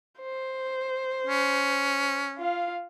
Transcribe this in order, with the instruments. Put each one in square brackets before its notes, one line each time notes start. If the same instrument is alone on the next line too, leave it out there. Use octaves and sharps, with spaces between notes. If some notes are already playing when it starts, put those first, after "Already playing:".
[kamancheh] C5
[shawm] C#4
[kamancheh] F4 F5